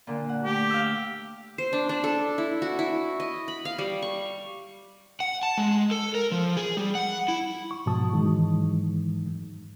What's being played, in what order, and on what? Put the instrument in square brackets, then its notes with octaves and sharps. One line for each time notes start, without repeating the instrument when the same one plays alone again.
[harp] A#2 D3 A#3
F#5
[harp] A3 [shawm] G4
[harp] F5 E6
[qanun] C5
D4
D4
A4
E4
F#4
E4
D#5
B5
F5
G3
C#6
[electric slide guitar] F#5
A5
G#3
A4
A#4
F3
G#4
G3
F#5
E4
[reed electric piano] C#6
G#2 B2 F3 F#4 A5 D#6
G#2 D#3 E3 F#3 G#3 D#4